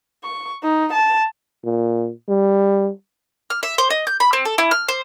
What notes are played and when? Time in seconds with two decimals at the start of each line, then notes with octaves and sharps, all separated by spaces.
0.24 C#6
0.63 D#4
0.93 A5
1.64 A#2
2.28 G3
3.50 F6
3.63 E5
3.78 C5
3.90 D#5
4.07 G6
4.20 B5
4.33 C4
4.45 A4
4.58 E4
4.71 F6
4.88 C5